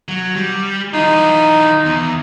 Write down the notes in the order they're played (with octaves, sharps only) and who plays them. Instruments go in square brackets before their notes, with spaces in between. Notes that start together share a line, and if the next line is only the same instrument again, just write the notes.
[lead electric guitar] F#3
G3
[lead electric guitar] E3 F4 [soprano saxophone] D#4
[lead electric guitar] E2